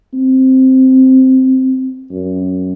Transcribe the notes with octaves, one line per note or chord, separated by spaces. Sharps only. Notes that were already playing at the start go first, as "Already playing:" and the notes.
C4
F#2